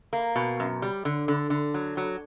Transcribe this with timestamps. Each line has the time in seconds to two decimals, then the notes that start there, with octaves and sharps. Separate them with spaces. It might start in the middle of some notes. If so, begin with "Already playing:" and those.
0.13 A#3
0.36 B2
0.60 F#2
0.82 G3
1.05 D3
1.28 D3
1.50 D3
1.74 F#3
1.97 F#3